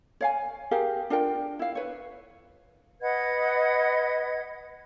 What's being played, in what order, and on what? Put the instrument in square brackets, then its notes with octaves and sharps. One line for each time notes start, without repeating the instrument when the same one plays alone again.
[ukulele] C#5 F5 G#5
G4 G#4 A#4 F5
D4 F4 A#4 G5
E4 F5
B4 C#5
[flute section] B4 D#5 F#5 G#6